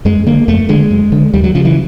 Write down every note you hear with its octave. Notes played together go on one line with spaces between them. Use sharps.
F#2 G#3
D3 A#3
F2 A3
D3 G#3
F#2
D3
D#2 G3
F#3
C#3 F3
E3